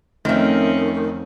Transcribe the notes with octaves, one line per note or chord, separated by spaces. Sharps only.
F2 D#3 A3 C4 C#4 E5